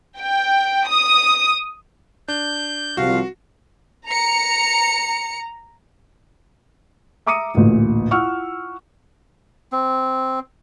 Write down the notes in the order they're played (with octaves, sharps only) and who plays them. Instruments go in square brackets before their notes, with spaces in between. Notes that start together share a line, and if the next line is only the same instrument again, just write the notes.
[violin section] G5
D#6
[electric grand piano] D4 [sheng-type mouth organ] G6
[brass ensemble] C2 F3 [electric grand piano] F#4 [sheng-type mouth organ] F5
[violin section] A#5 C#7
[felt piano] E5 A#5 D6 D#6 C#7 D#7
A1 D2 A#2
E4 F4 F#5 C#6 E6 F6
[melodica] C4